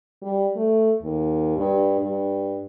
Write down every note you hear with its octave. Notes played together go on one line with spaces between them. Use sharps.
G3
A3
D#2
G2
G2